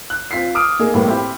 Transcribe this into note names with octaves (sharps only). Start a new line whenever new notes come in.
F#6
C4 F4 B6 C7
D6 D#6 F6 D7
A#3 D#4 G#4 A#4
A2 G3 A#3 B3
C4 E4 G4 E5 B5